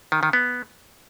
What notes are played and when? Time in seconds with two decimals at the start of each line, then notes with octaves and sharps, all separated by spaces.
0.12 D#3
0.23 D#3
0.33 B3